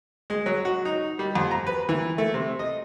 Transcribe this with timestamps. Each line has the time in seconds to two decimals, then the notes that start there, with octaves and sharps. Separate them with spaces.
0.30 G#3
0.46 F#3
0.65 F#4
0.85 D#4
1.19 G3
1.35 F2
1.51 A#5
1.66 B4
1.89 E3
2.18 A3
2.34 C3
2.59 D#5